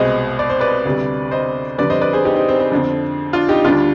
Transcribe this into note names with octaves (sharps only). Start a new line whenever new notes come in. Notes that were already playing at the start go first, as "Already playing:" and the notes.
Already playing: C2 B2 G#3 C5 D#5
D5
C5
B4 D5
D2 C3 G3
C5 D#5
F2 D3 G3 B4 D5
C5 D#5
B4 D5
G#4 C5
D#4 G4
C4 D#4
C4
C4
F2 D3 F3
D4 F4
D#4 G4
D2 D3 G3 D4 F4